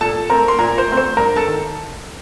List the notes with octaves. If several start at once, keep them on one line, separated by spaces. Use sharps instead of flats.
A#2 A4 A5
A3 C4 A#4 A#5
C6
A#2 A#4 A#5
C5 C6
A3 C4
C5 C6
G2 A#4 A#5
A4 A5
D#3